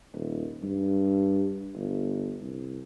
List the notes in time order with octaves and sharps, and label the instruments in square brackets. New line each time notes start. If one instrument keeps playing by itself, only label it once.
[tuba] D#1
G2
G1
C2